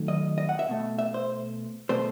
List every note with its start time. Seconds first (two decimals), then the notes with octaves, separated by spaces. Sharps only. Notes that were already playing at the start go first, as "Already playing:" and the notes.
Already playing: D#3 F#3 A3
0.08 D#5
0.38 D#5
0.49 F#5
0.59 E5
0.68 B2 A3
0.99 E5
1.14 C5
1.89 B2 A3 C5